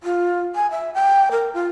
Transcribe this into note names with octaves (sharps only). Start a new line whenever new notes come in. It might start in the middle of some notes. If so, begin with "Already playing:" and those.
F4
G#5
E5
G5
A#4
F4